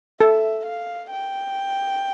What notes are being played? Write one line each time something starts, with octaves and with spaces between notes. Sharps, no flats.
A4 E5
F5
G5